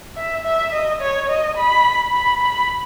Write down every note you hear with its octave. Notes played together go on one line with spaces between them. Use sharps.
E5
E5
D#5
C#5
D#5
B5
B5
B5